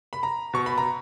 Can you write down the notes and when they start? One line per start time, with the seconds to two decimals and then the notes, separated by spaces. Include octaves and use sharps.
0.13 B5
0.23 A#5
0.53 B2 C#6
0.66 B5
0.78 A#5